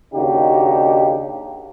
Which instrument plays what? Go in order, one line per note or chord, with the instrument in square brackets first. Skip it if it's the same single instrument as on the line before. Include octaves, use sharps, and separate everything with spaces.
[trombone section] D#2 C#3 D4 D#4 F#4 G4